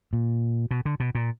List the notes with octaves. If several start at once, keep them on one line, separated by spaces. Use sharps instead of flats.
A#2
B2
D3
B2
A#2